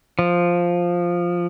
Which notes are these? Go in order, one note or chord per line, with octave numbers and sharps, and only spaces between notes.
F3